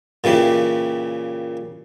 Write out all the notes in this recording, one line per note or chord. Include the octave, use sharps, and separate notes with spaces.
A#2 C#3 E3 G4